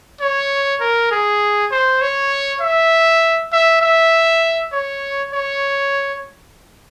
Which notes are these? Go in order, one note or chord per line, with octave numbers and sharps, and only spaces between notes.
C#5
A#4
G#4
C5
C#5
E5
E5
E5
C#5
C#5